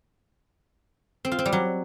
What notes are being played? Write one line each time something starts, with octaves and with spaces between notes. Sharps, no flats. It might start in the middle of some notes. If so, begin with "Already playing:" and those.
C4
F4
C4
G3
F#3